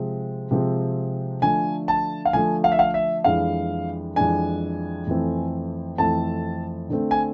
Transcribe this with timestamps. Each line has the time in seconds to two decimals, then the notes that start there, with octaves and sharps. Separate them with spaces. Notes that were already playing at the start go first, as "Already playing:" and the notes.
Already playing: C3 F3 G#3 C4
0.51 C3 F3 G#3 C4
1.42 D3 F3 A3 G#5
1.88 A5
2.25 F5
2.33 D3 F3 A3 G#5
2.64 F5
2.72 E5
2.79 F5
2.94 E5
3.24 F2 E3 G#3 D4 F5
4.16 F2 E3 G#3 D4 G#5
5.07 F2 E3 A3 C4
5.98 F2 E3 A3 C4 A5
6.90 D3 A3 C4
7.11 G#5